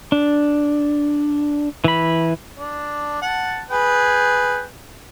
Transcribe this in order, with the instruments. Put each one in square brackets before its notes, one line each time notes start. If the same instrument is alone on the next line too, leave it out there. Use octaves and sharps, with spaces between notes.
[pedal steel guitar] D4
E3 B5
[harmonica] D4
F#5 A5
G#4 B4 G5